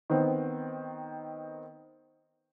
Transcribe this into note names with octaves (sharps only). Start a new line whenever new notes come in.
D#3 B3 C4